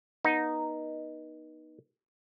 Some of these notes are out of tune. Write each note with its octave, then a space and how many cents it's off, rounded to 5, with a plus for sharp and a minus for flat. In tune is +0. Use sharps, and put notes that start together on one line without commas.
B3 -35 D#4 -5